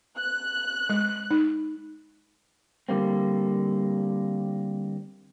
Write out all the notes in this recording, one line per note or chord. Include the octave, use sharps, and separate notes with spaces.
F#6
G#3
D#4
D3 G3 A#3 C4